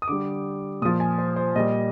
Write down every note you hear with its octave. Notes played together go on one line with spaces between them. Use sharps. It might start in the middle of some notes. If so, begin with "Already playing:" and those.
D#6
D3 G3 D6
A#2 F3 D#6
G#5
C5
C5
A#2 G3 D#5